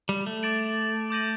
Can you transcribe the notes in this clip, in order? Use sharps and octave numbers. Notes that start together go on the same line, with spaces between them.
G3
A3
D6 A6 D7 F#7
D6 G6 A#6 D#7 F#7